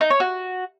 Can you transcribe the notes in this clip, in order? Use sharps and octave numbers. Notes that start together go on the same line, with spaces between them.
D#4
C#5
F#4